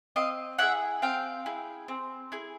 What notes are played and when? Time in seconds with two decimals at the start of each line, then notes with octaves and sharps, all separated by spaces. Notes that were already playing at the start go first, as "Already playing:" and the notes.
0.16 C4 D#5 F5
0.58 E4 G#4 E5 F#5
1.02 C4 F5 G5
1.46 E4 G#4
1.88 C4
2.32 E4 G#4